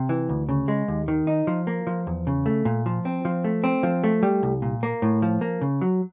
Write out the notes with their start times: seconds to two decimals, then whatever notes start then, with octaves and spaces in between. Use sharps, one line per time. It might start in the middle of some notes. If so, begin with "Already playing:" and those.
Already playing: C3
0.09 E3
0.29 D2
0.49 C#3
0.68 G#3
0.88 D#2
1.08 D#3
1.27 D#4
1.47 F3
1.67 A#3
1.87 F3
2.07 E2
2.27 C#3
2.46 A3
2.65 A#2
2.86 F3
3.05 C4
3.25 F3
3.44 A3
3.64 C4
3.83 F3
4.04 A3
4.23 G3
4.43 C2
4.62 A#2
4.83 A#3
5.02 A2
5.22 F3
5.41 A#3
5.61 C#3
5.81 F#3